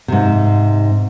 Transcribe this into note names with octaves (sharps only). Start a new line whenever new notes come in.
G#2 C3